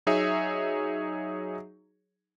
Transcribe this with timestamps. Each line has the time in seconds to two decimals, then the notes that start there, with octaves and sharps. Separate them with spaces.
0.07 F#3 D#4 G#4 C#5 E5